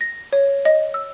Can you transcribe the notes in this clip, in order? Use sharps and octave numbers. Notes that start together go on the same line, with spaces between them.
A#6
C#5
D#5
E6